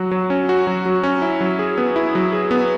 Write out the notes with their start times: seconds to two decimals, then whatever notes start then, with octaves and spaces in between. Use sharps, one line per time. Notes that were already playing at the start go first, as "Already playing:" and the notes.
Already playing: F#3 F#4
0.11 F#3
0.30 C#4
0.49 F#4
0.67 F#3
0.86 F#3
1.03 C#4
1.22 E4
1.41 F#3
1.59 G#4
1.78 B3
1.96 E4
2.15 F#3
2.33 G#4
2.51 B3